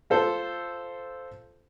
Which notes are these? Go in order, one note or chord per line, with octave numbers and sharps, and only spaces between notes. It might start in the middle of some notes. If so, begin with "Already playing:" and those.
F4 A4 C5